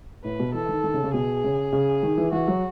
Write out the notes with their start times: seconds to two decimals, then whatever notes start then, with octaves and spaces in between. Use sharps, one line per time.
0.24 A2 B4
0.40 B2
0.54 E3 A4
0.69 D#3
0.84 D#3
0.94 C#3
1.04 C#3
1.14 B2 G#4
1.44 C#3
1.73 C#3
2.03 D#3
2.18 E3
2.32 E3 F#4
2.48 F#3